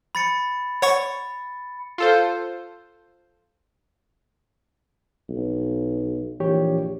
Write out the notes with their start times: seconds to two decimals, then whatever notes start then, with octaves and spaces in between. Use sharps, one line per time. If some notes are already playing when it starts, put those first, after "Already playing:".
0.15 B5 A6 C#7
0.82 C#5 F#5 C#6
1.98 F4 A4 C5
5.29 B1
6.40 A#1 E3 G4 C#5